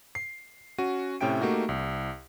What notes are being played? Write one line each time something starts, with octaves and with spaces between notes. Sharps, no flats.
C7
C#4 F#4 D#7
A2 C3 C#4 E5 G5 D7
A3 A#3 D#4 F#4 G4
C2